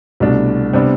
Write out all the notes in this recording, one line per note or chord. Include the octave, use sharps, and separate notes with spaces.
C2 B2 A3 D4
C3 G3 B3 D4